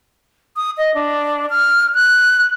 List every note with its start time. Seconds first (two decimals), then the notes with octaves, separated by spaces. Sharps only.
0.56 D#6
0.77 D#5
0.94 D4
1.50 F6
1.95 F#6